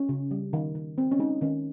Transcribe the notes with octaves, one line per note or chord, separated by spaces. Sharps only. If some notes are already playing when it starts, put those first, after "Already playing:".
Already playing: C#4
C#3
G3
D#3
D#3
C4
C#4
G#3 D#4
D#3 C#4